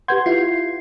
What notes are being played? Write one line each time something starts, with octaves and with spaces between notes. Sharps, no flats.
G4 B4 F#5 C6 G6 G#6
E4 F4 C7